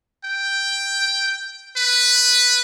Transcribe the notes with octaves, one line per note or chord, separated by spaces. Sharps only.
G5
B4